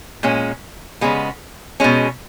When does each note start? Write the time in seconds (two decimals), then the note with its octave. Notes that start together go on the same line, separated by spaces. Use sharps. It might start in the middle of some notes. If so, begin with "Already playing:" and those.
0.23 A#2 G#3 C#4
1.01 C#3 G#3 B3
1.80 B2 G#3 C#4